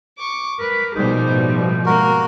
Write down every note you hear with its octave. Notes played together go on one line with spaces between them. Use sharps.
C#6 D6
A#4 B4
B2 F3 G3 D#4 G#4 C5
A2
G#2 A#3 F#4 A#4